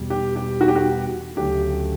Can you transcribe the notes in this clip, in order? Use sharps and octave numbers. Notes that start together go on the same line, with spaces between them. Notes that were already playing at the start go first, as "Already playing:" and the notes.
Already playing: E2 B2 G3
G4
G4
F#4
G4
F#4
D2 C#3 F#3 A3 G4